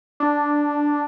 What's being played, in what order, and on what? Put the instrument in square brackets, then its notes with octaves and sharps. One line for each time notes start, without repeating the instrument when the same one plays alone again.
[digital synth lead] D4